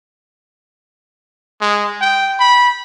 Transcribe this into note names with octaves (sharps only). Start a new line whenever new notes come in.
G#3
G5
B5